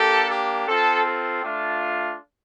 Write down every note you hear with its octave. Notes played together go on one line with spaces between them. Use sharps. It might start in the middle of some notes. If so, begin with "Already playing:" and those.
Already playing: A#3 D4 G4 A4
G4
C4 F4 A4
A4
A3 D4 F4